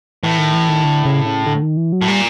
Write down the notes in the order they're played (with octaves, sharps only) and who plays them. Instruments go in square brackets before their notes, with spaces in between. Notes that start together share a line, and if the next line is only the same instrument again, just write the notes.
[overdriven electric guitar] A2 [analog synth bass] E3
[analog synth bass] D#3
E3
D#3
D3
C#3
C#3
D3
D#3
E3
F#3
[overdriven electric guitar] A2
[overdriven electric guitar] A#2 [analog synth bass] G3